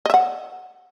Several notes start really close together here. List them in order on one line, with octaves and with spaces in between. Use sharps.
D#5 E5 F#5